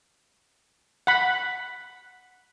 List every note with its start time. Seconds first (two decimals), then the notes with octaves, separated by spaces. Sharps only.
1.07 F#5 B5